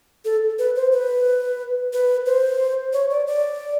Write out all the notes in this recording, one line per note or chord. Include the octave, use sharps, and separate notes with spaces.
A4
B4
C5
B4
B4
C5
C#5
D5
D5